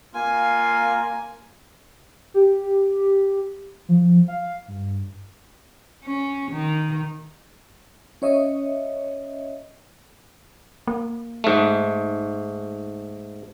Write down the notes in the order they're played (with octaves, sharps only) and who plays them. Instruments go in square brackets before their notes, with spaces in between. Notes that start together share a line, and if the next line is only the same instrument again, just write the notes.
[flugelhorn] A#3 [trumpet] F4 [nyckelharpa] G#5
[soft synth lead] G4
F3
F5
G2
[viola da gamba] C#4
D#3
[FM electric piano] C#4 C#5 D#5 E5
[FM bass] A#3
[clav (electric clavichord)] G#2 A3